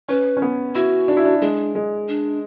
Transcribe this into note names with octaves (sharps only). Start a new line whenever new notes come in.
C#4 B4
C#4
B3
E4 F#4
D4
E4
D4
G#3 D4
G#3
D4